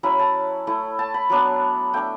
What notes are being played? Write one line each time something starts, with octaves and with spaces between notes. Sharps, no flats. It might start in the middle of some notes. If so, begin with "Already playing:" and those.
F#3 C#4 E4 B5
A5
A3 E4
A5
B5
F#3 B3 D4
A3 D4 G5